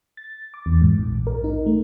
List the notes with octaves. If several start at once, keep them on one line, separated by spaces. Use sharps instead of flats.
A6
D6
E2
G#2
A#1
A#4
D#4
A3